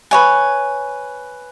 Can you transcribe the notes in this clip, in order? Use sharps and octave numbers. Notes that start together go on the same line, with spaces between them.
B4 C#5 G#5